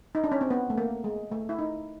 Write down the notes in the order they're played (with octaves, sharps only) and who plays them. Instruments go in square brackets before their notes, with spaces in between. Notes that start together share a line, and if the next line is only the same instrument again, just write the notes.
[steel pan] D#4
D4
C#4
C4
B3
A3
A#3
G#3
A3
E4
D#4